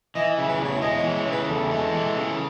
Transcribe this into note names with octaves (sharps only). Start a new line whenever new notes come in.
E3 D#5
E5
C#3
B4
E2 C#5
G#3 D#5
E3 C#5
C#5
C#3
B4
E2 A4
G#3
E3
C#3